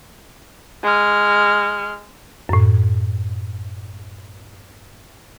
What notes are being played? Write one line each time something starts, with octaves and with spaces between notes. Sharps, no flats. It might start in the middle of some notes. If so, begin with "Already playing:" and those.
G#3 F6
F#2 A2